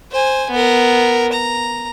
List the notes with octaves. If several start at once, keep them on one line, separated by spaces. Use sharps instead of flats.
C5 G#5
B3 A#4
A#5